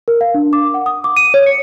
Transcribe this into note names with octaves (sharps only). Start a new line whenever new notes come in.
A#4
F5
D4
D6
F#5
D#6
D6
D#7
C#5
C#7